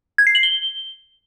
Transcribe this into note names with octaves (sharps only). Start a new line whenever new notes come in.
G#6
C7
F#7
G7